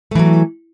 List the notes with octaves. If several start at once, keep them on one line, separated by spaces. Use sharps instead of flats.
E3 F#3 A3